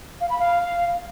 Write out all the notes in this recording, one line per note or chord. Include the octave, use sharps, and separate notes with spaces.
F5
B5
F5